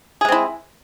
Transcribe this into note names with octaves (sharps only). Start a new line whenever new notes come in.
G#3 C4 E4 G#4